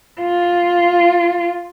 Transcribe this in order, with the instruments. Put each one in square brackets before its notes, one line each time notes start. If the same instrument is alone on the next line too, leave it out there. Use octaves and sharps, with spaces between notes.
[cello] F4